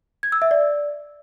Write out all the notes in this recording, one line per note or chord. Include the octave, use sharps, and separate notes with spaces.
G#6
E6
E5
D5